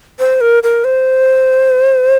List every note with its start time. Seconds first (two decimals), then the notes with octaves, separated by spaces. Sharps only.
0.19 C5
0.41 A#4
0.63 A#4
0.84 C5